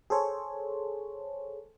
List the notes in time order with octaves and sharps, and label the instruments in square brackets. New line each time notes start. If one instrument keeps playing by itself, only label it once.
[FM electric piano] G#4 A4 C5 C#5